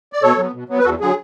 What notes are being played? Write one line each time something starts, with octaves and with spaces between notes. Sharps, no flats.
D5
B2 A4 C#5
F#3 B3
B2
F#3 B3
B4
E2 F#4 A4
D3 F#3 G#4